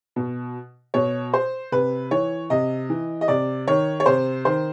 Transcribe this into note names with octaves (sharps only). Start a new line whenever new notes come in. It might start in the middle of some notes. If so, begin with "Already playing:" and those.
B2
B2 C#5
C5
C3 B4
E3 C#5
C3 D#5
E3
D#5
C3 D5
D#3 C#5
C#5
C3 C5
D#3 C5